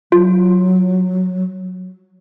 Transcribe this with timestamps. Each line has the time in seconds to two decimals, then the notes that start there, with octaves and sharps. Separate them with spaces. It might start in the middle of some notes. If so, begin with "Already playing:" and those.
0.12 F#3 F4